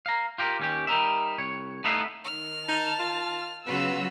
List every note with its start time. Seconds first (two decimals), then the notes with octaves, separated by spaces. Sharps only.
0.06 F5 A#5
0.38 F4 G4 A#4
0.60 D#2 C#4 G4
0.87 G3 D#4 A#4 E5
1.38 C2 C#5
1.84 A3 B3 D#4 E5 F5
2.24 D#3 F6
2.68 D#4 A5
2.99 F4
3.66 C#3 F#3 B3 F4 F#4 B4 E6